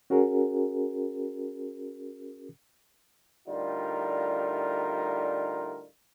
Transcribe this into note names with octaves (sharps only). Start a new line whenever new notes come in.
C#4 F#4 G#4 A#4
A2 D3 G3 D#4 F4 A#4